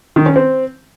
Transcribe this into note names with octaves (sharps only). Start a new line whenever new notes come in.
D#3
C#4
C4